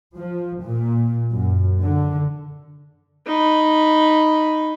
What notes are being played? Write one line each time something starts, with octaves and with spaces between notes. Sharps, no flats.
F3
A#2
F#2
D3
D#4 B5